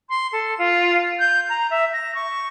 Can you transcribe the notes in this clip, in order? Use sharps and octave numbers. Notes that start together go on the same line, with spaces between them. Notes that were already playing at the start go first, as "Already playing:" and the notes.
C6
A4
F4
G6
A#5
E5
A#6
C#6